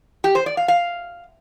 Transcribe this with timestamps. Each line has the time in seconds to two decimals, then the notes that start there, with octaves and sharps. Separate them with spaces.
0.24 G4
0.35 C5
0.46 D5
0.57 F5
0.68 F5